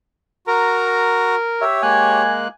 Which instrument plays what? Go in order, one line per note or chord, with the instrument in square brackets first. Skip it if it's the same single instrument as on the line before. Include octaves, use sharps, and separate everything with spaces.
[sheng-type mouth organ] F#4 A#5 [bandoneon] A#4
[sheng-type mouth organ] G4 C#5 [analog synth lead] E5
[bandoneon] G#3 A#3 F#6 [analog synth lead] G#5